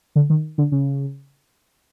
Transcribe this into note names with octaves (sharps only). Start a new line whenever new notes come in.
D3
D#3
D3
C#3